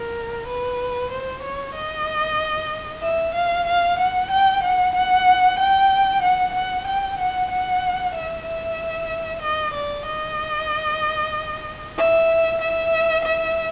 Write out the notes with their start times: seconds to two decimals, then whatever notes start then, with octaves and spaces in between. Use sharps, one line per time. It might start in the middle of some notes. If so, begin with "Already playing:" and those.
Already playing: A#4
0.47 B4
1.11 C5
1.43 C#5
1.75 D#5
3.02 E5
3.35 F5
3.67 F5
3.99 F#5
4.31 G5
4.63 F#5
4.95 F#5
5.59 G5
6.22 F#5
6.54 F#5
6.87 G5
7.18 F#5
7.50 F#5
8.15 E5
8.46 E5
9.42 D#5
9.74 D5
10.07 D#5
11.98 E5
12.61 E5
13.25 E5